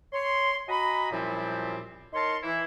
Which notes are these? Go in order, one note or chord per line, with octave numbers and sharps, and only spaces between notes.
C#5 C6
F#4 D#5 G#5 A#5 B5
F#2 A#2 F3 G3 C4 E4
D#4 A#4 C#5 A5 C6
E3 E4